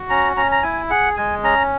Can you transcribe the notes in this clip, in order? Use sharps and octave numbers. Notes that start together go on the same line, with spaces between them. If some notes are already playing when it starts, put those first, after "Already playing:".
Already playing: F#4
C#4 A#5
C#4 A#5
A#5
E4 G#5
G#4 F#5
G#3 G#5
C#4 A#5